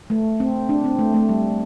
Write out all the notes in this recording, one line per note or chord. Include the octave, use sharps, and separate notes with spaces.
A3
C4
D4
C4
A3
A3
G3